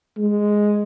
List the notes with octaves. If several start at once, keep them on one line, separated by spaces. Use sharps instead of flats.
G#3